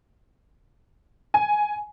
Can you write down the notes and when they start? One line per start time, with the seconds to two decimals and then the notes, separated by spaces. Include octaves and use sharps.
1.34 G#5